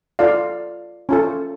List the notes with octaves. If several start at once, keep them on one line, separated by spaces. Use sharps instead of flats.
F4 A4 D5 F5
C#4 F4 A4